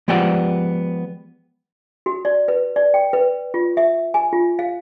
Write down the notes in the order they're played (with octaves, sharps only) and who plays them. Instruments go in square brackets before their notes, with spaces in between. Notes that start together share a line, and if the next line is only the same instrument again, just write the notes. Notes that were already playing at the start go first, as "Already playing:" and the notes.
[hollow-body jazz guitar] F3 G#3 B3 G4 D5 F#5
[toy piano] F#4
D5
B4
D5
G5
B4
F4
E5
G#5
F4
F5